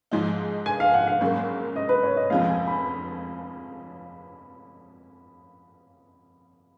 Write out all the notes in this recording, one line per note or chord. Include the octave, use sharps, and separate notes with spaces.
G#2 F3 G#3 D#4
G#5
F5
F#5
F5
G#1 G#2 F#3 A#3 C#4
D#5
B4
C#5
D#5
F1 F2 F3 G#3 F5
G#5
B5